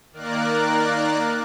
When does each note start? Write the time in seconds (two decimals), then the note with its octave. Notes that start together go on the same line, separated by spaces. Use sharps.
0.13 D#3 A#3 A#4 D5 F#6